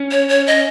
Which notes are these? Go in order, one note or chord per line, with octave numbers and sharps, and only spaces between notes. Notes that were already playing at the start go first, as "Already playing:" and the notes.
Already playing: C#4
C#5
C#5
D#5